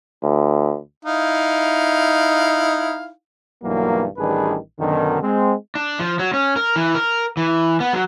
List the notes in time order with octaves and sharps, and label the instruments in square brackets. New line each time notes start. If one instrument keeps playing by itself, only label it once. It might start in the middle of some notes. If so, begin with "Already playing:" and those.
[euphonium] D2
[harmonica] D#4 E4 F5
[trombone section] B1 G2 E3 F#3 A#3
A1 D#3 G3 D4 G#4 B4
F#2 B2 D3 D#3
G#3 C4
[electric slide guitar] D4
F3
F#3
C#4
A#4
E3
A#4
E3
B3
F#3